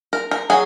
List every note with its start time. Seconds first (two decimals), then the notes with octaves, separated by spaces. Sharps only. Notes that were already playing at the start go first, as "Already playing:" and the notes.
0.13 A#4
0.31 A#4
0.50 F#3 G#4